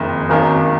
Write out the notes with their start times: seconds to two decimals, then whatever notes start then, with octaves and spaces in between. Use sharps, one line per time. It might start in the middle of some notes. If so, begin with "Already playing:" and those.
Already playing: F#1 F2 D#3
0.29 G#1 F#2 D#3